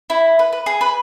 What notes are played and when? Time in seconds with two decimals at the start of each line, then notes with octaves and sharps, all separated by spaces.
0.10 E4
0.39 B4
0.53 B4
0.66 G#4
0.81 B4